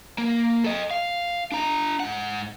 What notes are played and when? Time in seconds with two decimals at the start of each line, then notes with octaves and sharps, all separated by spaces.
0.18 A#3
0.64 A4 D#5
0.91 F5
1.52 D4 A#5
2.00 G#2 F#5